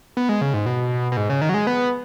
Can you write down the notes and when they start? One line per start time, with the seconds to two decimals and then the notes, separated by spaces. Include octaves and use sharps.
0.17 B3
0.29 G#3
0.41 C#3
0.54 G#2
0.66 B2
1.12 B2
1.17 G#2
1.30 C#3
1.41 D#3
1.49 F#3
1.54 G#3
1.67 B3